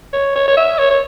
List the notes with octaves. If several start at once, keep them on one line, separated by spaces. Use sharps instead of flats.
C#5
C#5
C#5
E5
C#5
C#5